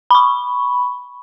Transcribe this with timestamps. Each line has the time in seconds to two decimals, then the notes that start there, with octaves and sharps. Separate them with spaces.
0.11 B5 C#6